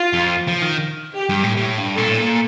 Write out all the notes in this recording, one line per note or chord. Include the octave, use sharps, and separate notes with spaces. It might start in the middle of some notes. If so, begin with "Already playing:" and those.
Already playing: F4
F2
F3
D#3
G4
G2
A2
A2
G2
A#2 A4
A2
A#2